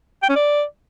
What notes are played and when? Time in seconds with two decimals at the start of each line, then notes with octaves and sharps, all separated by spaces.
0.23 G5
0.29 C#4
0.36 D5